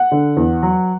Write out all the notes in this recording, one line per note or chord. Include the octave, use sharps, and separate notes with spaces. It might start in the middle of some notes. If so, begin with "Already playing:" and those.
Already playing: F#5
D3
E2
F#3